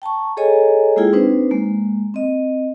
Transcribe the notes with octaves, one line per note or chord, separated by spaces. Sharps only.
G5 A5 A#5 C#6
G#4 A4 C#5 D#5 G#5 A#5
G#3 A#3 E4 F4 G#4 G5
C4 D4 D#4 B4 C5
G#3 A#3
C4 D#5